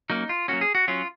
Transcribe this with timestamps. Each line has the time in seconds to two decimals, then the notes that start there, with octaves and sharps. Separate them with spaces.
0.10 F#3 A#3 C#4 D#4
0.29 F4
0.48 F#3 A#3 C#4 F#4
0.61 G#4
0.75 F#4
0.88 F#3 C#4 F4